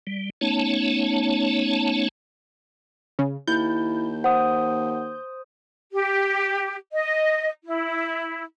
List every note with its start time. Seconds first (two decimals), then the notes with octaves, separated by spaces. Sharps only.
0.07 G3
0.41 A3 B3 C#4 D#4 C#5 A5
3.19 C#3
3.48 D#2 E4 G6
4.24 C5 F#5 D#6
5.93 G4
6.93 D#5
7.64 E4